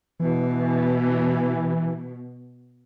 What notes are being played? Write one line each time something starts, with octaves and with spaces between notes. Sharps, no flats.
B2 E3